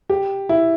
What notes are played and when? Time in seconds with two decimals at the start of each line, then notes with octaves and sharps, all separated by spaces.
0.10 G4
0.49 E4